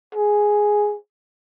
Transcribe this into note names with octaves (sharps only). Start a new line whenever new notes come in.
G#4